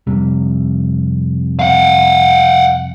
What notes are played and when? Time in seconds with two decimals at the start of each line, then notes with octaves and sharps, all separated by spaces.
0.07 F2 C3 G3
1.59 F5 F#5